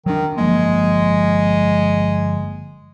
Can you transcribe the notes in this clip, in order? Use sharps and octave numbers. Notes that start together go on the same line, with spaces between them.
D#3 F#3 D4
G1 F3 G#3 A#3